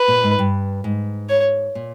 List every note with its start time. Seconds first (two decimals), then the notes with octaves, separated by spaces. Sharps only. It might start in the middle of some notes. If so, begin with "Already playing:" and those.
Already playing: B4
0.08 A#2
0.24 G#2
0.39 G2
0.84 G#2
1.29 C#5
1.75 A#2